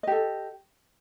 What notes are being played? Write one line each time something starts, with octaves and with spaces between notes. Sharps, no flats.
G4 A4 D#5